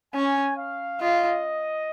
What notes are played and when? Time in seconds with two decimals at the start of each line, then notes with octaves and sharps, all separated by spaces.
0.15 C#4 G#5
0.57 F5
1.01 F4 D#5